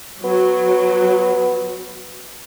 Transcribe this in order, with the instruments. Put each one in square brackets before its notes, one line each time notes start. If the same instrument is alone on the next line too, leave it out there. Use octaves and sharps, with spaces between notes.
[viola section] F#3 [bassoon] B3